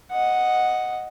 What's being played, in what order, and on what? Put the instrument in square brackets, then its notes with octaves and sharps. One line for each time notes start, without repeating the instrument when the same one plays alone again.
[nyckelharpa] D#5 F#5